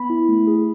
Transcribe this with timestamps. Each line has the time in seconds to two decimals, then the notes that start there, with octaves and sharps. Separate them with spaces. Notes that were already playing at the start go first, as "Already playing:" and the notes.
Already playing: B3 B5
0.10 E4
0.29 A3
0.47 G#4